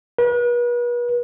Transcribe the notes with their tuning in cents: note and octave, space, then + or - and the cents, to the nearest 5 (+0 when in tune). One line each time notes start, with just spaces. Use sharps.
B4 -40